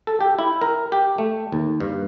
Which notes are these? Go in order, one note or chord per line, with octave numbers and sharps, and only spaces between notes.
A4
G4
E4
A#4
G4
A3
D#2
G2